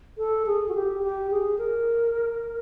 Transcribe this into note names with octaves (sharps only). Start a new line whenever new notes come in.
A4
G#4
F#4
G4
G4
G#4
A#4